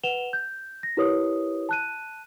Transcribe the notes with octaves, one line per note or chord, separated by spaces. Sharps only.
B4 F#5 E7 F7 G7
G6
A#6
E4 G4 A#4 B4 C#5 D#6
A5 F#6 D#7